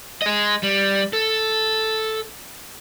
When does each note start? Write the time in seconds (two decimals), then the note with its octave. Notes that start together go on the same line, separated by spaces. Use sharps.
0.22 G#4 D#5
0.63 G3
1.13 A4